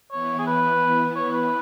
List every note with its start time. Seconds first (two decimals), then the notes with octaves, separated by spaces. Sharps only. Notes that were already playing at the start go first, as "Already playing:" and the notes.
0.12 E3 B3 E4 C#5
0.39 G#4
0.46 B4
1.15 C#5
1.32 B4